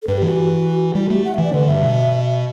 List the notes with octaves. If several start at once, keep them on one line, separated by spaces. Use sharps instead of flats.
A4
G2 B4
G4
E3 F#4
G4
F#4
G3 E4
F#4
A3 G4
F#5
E5
E3
D5
D3 B4
G2 E5
B2